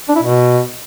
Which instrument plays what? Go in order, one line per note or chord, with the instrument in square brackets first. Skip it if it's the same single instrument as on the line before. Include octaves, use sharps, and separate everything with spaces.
[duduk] D4
E4
B2